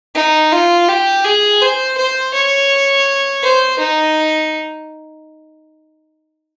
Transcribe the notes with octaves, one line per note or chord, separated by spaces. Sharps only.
D#4
F4
G4
G#4
C5
C5
C#5
C5
D#4